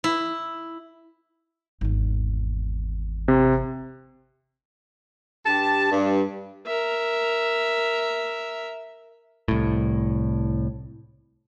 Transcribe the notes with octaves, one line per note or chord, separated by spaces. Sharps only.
E4
G#1 E2
C3
G2 G4 A5
G2
A#4 E5
C2 A2